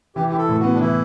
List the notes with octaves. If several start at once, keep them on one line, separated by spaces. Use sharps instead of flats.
E3 G4
G4
E4
A4
A2
B3 F#4
D4
E3 E4